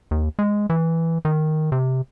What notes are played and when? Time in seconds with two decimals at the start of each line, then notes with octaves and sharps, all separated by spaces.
0.11 D#2
0.39 G#3
0.70 E3
1.25 D#3
1.72 C3